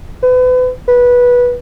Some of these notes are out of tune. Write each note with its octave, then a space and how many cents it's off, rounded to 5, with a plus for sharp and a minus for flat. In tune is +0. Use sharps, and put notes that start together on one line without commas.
B4 +35
B4 -15